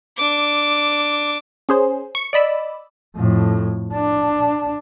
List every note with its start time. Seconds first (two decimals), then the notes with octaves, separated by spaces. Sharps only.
0.17 D4 D6
1.69 C#4 G#4 C5
2.15 C#6
2.33 D5 D#5 B5 E6
3.17 F2 A2
3.93 D4